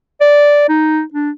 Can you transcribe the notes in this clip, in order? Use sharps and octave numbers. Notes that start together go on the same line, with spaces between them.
D5
D#4
D4